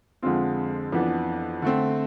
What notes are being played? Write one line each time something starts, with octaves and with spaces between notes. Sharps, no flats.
F2 D3 G#3 C4 F4
F2 E3 B3 D4
D3 A3 C4